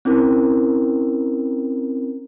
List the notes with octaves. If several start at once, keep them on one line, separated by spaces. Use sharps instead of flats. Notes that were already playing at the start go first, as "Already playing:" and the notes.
C4 C#4 E4 A#4